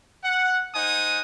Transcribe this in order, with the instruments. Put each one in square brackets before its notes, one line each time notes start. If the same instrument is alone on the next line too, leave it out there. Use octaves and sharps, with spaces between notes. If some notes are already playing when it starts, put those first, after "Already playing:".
[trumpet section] F#5
D#4 C5 F#5 G#5 D#6